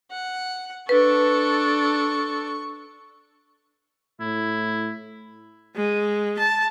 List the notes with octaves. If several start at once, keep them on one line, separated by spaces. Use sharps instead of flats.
F#5
D4 A4 B4 C#6
A2 E4
G#3
A5